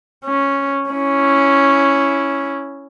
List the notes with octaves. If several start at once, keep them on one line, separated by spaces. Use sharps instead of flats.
C#4
C#4 E4